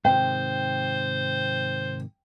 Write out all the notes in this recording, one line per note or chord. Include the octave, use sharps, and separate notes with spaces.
G#2 C3 D#3 C5 G5